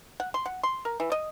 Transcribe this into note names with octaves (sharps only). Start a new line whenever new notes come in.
F#5
C6
F#5
C6
A#4
E3
D#5